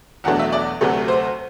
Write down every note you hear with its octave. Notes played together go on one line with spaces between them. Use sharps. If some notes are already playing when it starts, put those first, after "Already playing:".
E2 B2 F#3 A3 D4 F#5
E5
D5
D2 C3 F#3 A3
C5